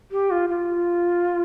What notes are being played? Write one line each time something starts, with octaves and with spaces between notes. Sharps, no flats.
G4
F4
F4